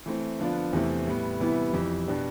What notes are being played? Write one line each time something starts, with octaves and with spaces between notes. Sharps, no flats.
E3 A3 C4
D3 F3 B3 D4 F4
E2 C3 E3 A3 C4
A2 G3 B3
C3 E3 G3 B3 E4
F2 E3 G3
B2 B3 D4 G4